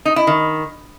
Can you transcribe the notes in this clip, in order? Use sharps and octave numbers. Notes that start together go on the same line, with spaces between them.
D#4
E4
D#3